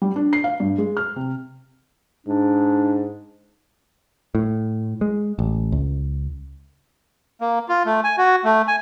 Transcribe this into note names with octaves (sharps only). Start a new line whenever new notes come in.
G3
D4
C7
F5
G2
G#3
F6
C3
G#2 D4
A2
G#3
A1
C#2
A#3
F4
A3
G#5
F#4
A3
G#5